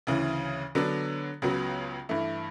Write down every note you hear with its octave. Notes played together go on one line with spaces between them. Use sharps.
D2 C#3 E3
D3 F#3 B3 D4
C#2 C#3 F#3 B3 F#4
G2 E3 A3